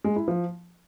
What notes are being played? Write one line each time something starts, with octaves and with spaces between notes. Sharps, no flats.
G#3
E4
F3